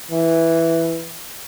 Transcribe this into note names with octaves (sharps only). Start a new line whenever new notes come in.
E3